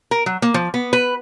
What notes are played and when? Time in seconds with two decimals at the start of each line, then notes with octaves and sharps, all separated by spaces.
0.11 A#4
0.26 F#3
0.42 A#3
0.54 F3
0.74 B3
0.93 B4